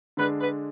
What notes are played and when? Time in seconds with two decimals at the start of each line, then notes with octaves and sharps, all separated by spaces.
0.17 D3 G#3 D4 B4
0.40 B4